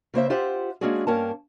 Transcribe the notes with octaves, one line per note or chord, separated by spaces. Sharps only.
C#3 A#3 C5 E5
F4 G4 C5 E5 F#5
G#3 A#3 C#4 D4 F#4 G#4
G2 A#3 C#4 A#4 G5 A5